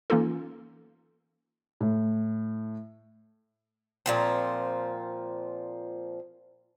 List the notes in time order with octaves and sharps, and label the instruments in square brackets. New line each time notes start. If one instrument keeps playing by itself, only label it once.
[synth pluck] E3 A#3 C#4 D#4 F4 A4
[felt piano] A2
[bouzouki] A#2 F3 C4